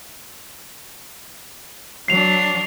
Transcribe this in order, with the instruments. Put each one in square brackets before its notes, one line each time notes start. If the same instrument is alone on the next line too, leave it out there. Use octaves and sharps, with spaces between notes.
[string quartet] F#3 D4 [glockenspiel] C7 F7